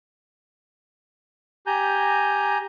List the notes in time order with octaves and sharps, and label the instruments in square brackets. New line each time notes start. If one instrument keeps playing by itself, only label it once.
[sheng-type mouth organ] G4 G#5 A#5 G6